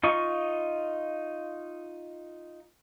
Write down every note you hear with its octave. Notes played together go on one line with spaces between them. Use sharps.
D#4 F4 D#5 C#6